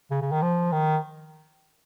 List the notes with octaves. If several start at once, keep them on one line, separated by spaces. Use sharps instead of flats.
C#3
C#3
D#3
F3
D#3